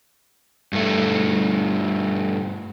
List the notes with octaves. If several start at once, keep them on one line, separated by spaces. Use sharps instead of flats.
G2 A3